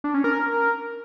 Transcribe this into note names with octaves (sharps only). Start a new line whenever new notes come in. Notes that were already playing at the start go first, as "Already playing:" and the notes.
D4
C#4
A#4